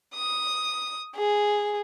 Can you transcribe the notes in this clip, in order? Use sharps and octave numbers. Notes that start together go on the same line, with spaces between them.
D#6
G#4